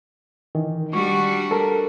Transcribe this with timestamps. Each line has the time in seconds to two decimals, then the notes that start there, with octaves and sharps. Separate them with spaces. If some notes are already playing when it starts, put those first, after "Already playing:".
0.55 D#3 E3
0.93 G3 D4 F#4 C#6
1.51 A4 A#4